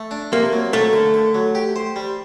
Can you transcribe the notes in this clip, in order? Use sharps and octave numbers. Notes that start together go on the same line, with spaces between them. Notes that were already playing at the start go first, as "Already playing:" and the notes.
Already playing: A3
D4
C3 A#3
F#3
A3 A#3
D3
D3
F#3
G4
C5
G3